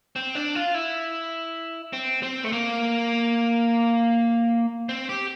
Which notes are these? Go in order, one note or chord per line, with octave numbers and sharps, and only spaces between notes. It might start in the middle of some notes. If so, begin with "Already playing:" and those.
C4
D4
F4
E4
C4
C4
A3
A#3
C4
G4